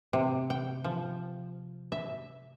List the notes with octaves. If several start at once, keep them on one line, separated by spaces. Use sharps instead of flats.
C3
G5
F3
E5